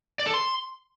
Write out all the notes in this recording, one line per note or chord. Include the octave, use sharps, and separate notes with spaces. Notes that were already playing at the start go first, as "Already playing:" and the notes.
D5
A4
C6